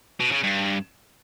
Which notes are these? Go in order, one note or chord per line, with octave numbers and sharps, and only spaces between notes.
B2
C#3
G2